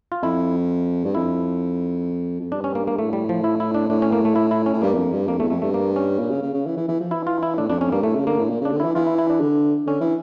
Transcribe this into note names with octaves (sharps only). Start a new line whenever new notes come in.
F4
F2 E4
G2
F2 E4
F2
G2 D4
C#4
A#3
G2 A#3
A2 A3
G3
F3
E4
E4
D4
A2 D4
C#4
A#3
A3
E4
E4
C#4
A2
G2 A#3
E2
F2
G2
F2 A#3
E2 A3
F2 A3
G2 A3
A#3
C#4
A#2
C#3
C#3
C#3
E3
E3
E3
F3
E3 E4
F4
E4
A2 D4
F2 D4
F2 C#4
G2 A#3
A2 A3
C#3
D3 A#3
A2
A#2
C#3 D4
D3
E3 E4
E3 F4
E4
E4
D4
D3
D3 C#4
E3